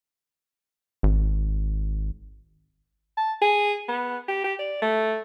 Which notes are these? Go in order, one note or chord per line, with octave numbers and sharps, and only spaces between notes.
G#1
A5
G#4
B3
G4
G4
D5
A3